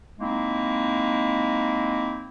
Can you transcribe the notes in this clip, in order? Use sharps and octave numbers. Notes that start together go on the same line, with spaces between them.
G#3 A#3 C4 D#4 E4